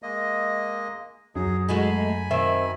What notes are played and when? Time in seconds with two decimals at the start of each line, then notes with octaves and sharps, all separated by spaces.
0.03 G#3 A#3 D#5
1.35 F#2 F#3 G#4
1.69 G#3 A3 F#4 G#5 B5
2.31 D#3 C4 C#4 E5